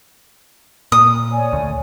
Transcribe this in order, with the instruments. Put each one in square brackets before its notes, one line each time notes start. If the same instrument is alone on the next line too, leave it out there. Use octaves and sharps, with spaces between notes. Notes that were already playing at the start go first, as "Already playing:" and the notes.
[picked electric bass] A#2 [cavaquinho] D#6
[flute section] C#5 D5 G#5
[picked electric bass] D2